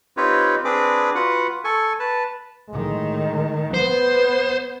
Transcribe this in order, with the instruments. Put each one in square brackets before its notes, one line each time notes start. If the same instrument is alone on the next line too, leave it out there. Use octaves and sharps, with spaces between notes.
[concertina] C4 D#4 F4 G4 B4 C#5
C4 D4 G#4 B4 D6
F4 F#4 B4 F#5
A4 G#5 C#6
B4 A5
[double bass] A2 D#3 [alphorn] G#3
[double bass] B3 [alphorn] B4 [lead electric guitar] C5